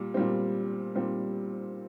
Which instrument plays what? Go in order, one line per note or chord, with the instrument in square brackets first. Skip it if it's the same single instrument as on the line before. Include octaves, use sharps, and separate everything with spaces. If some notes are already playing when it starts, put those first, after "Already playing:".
Already playing: [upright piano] A#2 G3
A#2 G3 C4
A#2 G3 C4